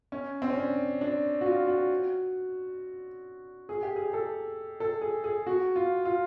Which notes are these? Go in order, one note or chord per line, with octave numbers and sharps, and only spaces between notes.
C#4
C4
C#4
D4
D4
F#4
F4
F#4
G#4
G4
G#4
A4
A4
G#4
G#4
F#4
F4
F4